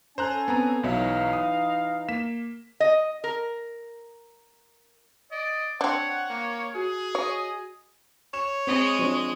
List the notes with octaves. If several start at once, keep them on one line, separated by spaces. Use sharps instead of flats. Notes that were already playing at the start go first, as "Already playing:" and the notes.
C#4 A4 C5 G#5 A#5 F#6
B3 C4 A#5
B1 E3 F#3 D#4 E5 F5
D#6
A#3 B6 E7
D#5
A#4
D5 D#5
C4 D4 C#5 F#5
A#3
F#4 G#4
C#5 D#5
C#5 E7
G#3 C4 D#5
F3 C4 D4